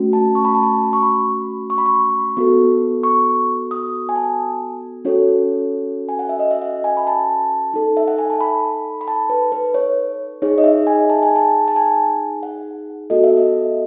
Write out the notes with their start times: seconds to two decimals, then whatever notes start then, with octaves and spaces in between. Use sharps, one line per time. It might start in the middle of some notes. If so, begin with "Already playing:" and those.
Already playing: A3 C#4 F#4
0.13 A5
0.35 C#6
0.45 B5
0.55 A5
0.63 B5
0.93 C#6
1.03 B5
1.70 C#6
1.78 B5
1.86 C#6
2.37 B3 F#4 A4
3.03 C#6
3.71 D#6
4.09 G#5
4.16 A5
5.05 C#4 F#4 A4 C#5
6.09 G#5
6.19 F#5
6.29 E5
6.39 D#5
6.51 E5
6.62 F#5
6.84 G#5
6.97 B5
7.07 A5
7.73 D#4 A4
7.97 E5
8.08 F#5
8.19 G#5
8.30 A5
8.41 B5
9.01 B5
9.08 A5
9.30 B4
9.52 B4
9.74 C#5
10.42 D#4 G#4 C#5
10.58 D#5
10.64 E5
10.87 G#5
11.10 A5
11.23 G#5
11.36 A5
11.68 A5
11.76 G#5
12.43 F#5
13.10 B3 F#4 A4 D#5
13.24 E5
13.37 D#5